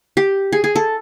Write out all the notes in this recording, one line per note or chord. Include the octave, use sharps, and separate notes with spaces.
G4
G#4
G#4
A4